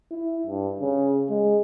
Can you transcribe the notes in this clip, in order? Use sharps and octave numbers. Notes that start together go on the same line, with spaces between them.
E4
G2
C#3
G#3